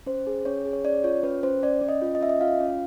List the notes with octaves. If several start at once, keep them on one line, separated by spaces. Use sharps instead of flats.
C#4 C5
G#4
C#4 C#5
G#4
C#5
C#4 D5
F4 C#5
C#4 B4
C#4 C5
C#4 D5
C#4
D#5
F4
D#5
C#4 E5
D#5
F4 F5
C#4